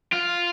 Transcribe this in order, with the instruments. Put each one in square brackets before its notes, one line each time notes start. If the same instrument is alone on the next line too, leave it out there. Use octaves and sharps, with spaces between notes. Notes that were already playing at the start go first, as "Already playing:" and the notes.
[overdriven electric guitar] F4